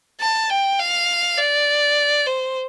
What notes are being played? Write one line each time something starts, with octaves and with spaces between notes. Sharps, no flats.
A5
G5
F5
D5
C5